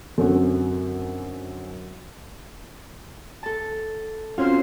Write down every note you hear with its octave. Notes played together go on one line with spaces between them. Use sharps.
F#2 D3 C4 C#4 F#4
A4 A5
C4 C#4 F4 F#4 C5 F5